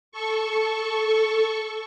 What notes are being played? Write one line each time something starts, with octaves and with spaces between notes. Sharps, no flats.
A4 C#6